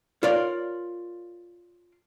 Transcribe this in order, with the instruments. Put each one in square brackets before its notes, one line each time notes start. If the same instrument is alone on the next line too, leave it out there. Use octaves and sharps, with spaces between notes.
[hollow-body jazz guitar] F4 A#4 C#5 D5 F5